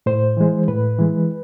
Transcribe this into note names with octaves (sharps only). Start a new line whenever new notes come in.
A2 C5
E3 G#3
A2 B4
E3 G#3